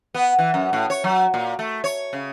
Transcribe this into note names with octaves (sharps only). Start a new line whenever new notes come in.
B3
E3
F#2
A2
C#5
F#3
A#2
A3
C#5
C#3